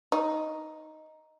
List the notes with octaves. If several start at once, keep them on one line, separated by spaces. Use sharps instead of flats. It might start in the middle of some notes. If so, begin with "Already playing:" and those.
D#4